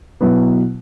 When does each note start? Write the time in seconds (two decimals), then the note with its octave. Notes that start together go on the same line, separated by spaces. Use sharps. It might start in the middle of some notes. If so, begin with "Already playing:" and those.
0.20 B2 F#3 B3 E4